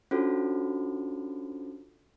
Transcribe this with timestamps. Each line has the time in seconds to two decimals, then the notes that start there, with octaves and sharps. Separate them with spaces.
0.11 C#4 D4 F4 F#4 A4 C5